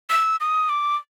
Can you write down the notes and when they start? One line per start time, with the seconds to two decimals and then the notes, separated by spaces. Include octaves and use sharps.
0.10 E6
0.40 D#6
0.69 D6